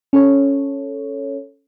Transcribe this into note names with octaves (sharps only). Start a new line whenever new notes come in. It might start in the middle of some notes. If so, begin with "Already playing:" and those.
C#4 A4 C#5